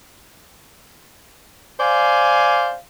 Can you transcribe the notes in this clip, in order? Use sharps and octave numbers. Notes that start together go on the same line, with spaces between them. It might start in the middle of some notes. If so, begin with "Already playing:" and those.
C5 D5 F5 G#5